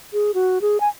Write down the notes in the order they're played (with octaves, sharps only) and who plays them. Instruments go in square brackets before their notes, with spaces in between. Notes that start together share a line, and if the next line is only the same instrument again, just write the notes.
[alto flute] G#4
F#4
G#4
G#5